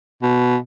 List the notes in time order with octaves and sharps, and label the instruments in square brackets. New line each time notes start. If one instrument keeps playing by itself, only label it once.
[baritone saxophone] B2